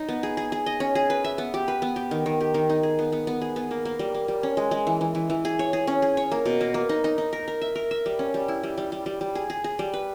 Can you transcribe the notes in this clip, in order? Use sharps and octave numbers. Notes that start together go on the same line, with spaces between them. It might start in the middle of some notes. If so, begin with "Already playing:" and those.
Already playing: D#4
B3
G#4
G#4
G#4
D#5
C#4
G#4
B4
E5
B3
G4
B4
B3
G4
D#3
D#3
G4
D#3
D#4
G#4
B3
B3
B3
G#4
B3
A#3
A#3
G3
A#3
G3
C#4
G#3
G#3
E3
E3
E3
E3
G#4
C#5
G#4
C#4
G#4
C#5
A#3
B2
A#3
A#3
D#4
D#4
D#4
A#4
A#4
E5
A#4
E5
G3
C#4
G3
E4
G3
G3
G3
G3
G3
G#4
G#4
G#4
G3
B4